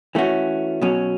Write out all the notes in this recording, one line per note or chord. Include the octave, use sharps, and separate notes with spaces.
E3 A3 C#4 F#4
B2 F#3 C#4